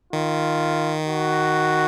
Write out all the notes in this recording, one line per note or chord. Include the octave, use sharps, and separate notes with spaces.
D#3 F4
F#4